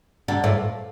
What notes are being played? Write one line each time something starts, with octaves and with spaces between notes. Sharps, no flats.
D3
A2